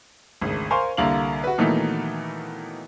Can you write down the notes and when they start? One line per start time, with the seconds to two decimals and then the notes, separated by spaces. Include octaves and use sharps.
0.41 G#1 D2 C#3
0.70 A#4 C5 F5 G#5 C6 C#6
0.97 C2 D3 A#3 F5 F#7
1.44 F#4 B4
1.58 A#2 D#3 E3 F#3 A3 B3